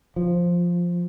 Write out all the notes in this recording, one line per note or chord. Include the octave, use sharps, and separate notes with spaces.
F3